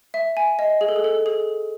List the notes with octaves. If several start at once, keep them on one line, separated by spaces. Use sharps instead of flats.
E5
G#5
D#5
G#4
A4
G#4
A4
G#4